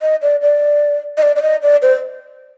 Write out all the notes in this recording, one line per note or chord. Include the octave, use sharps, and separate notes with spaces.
D#5
D5
D5
D#5
D5
D5
D#5
D5
C5